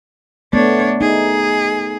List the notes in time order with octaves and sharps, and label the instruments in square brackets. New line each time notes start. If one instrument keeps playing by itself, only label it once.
[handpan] A3 B3 [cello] D4 C#5
[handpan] D#4 [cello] G#4